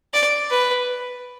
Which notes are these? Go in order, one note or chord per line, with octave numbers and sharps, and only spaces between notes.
D5
B4